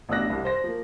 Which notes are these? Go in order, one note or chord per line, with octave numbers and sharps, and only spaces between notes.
A1 B2 D4 E6 F#6 A#6
C2
C5 A#6
F3 A#3